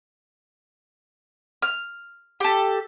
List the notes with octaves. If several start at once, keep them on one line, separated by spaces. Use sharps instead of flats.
F6
G4 A4